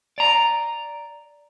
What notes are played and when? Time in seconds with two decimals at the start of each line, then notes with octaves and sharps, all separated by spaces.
0.18 D5 A#5